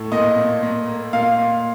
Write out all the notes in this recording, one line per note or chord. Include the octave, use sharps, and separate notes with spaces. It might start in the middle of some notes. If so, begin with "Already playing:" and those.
Already playing: A2 A3
A#2 D#5
A#2
A#2
A#3
A#2 F5
A#2